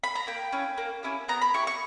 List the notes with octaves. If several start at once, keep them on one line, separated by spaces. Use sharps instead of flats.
B5
A#5
A#3 G5
C#4 E4
A#3
C#4 E4 G4
B3 A#5
B5
E4 G4 C#6
C#6